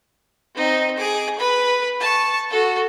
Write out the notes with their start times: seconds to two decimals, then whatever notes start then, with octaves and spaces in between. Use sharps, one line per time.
0.54 C4 D#4
0.97 G#4 D6
1.38 B4 B5
2.00 A5 C#6
2.50 F#4 A4